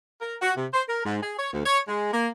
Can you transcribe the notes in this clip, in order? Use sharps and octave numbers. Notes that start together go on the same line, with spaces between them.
A#4
F#4
C3
C5
A#4
G#2
G#4
C#5
D2
C#5
G#3
A#3